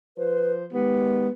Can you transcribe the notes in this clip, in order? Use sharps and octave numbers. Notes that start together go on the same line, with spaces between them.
F3 B4 C5
D#3 G#3 B3 G4